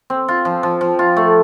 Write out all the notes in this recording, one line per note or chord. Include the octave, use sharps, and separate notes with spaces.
C4
F4
F3
F3
F3
F4
A3